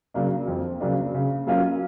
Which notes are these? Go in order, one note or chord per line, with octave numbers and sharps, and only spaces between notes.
C#3 F#3 A#3 D4
F2
C#3 F#3 A#3 D4
C#3
F#3 A#3 C#4 F4